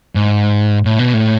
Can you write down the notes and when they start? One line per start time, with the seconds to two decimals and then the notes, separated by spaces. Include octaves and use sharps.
0.15 G#2
0.85 A2
0.99 B2
1.14 A2